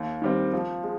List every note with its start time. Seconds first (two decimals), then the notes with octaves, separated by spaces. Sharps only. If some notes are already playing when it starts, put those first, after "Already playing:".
Already playing: D#2
0.22 D#3 G3 C4
0.53 F3
0.83 G#3